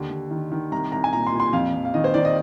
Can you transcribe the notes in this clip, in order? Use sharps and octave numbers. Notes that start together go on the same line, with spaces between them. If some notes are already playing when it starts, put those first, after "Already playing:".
Already playing: D#2 D3
D#2
D#3
D#3
C2 A#5
C2 A#5
G#5
A#2 A#5
C6
A#2
C6
F2 F5
F2
F5
D#3 D#5
C5
D#3 D5
D#5